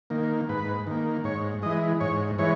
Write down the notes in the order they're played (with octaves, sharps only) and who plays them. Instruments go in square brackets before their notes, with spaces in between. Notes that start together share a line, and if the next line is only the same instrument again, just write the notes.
[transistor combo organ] D#3 A#3
G#2 B4
D#3 A#3
G#2 C#5
E3 G#3 D#5
G#2 C#5
E3 G#3 C#5